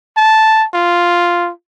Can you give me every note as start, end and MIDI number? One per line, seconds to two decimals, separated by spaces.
0.17 0.66 81
0.74 1.50 65